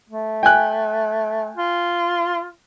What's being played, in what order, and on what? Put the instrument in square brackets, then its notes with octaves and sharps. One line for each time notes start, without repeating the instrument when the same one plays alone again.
[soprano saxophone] A3
[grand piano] G5 G#5 F#6
[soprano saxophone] F4